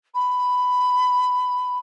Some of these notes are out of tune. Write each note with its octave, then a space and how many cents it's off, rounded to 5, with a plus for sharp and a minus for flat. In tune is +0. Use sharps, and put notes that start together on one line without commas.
B5 +10